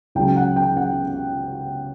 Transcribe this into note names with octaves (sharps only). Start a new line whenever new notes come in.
C#2 C#3 F#3 G5
F#5
G5
F#5